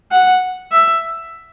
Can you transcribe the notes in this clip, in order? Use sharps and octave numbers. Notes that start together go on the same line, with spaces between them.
F#5
E5